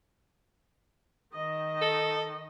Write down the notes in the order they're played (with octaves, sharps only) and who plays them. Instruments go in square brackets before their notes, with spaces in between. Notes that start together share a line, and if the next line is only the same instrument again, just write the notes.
[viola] D#3 D#5
[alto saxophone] A4